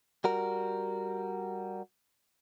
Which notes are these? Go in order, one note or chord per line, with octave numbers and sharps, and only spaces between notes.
G3 F#4 A#4